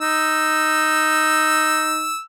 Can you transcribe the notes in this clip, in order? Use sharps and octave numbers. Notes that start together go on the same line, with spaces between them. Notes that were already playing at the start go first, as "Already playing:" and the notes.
D#4 E6